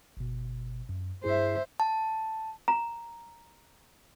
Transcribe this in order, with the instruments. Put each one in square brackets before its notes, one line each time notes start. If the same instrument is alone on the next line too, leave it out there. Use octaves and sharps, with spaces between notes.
[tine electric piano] G1 B2
F#2
[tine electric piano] G2 E4 G#4 [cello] C5 E5
[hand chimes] A5
[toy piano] A#5